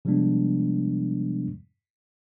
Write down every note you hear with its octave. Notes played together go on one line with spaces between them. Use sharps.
C3 F3 G3 G#3 B3 D4